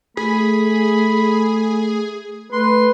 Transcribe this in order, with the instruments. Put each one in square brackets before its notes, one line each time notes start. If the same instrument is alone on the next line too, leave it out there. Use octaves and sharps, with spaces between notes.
[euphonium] A3 [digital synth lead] G#4 [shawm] B5
[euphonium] A3 [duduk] B4 [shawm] C6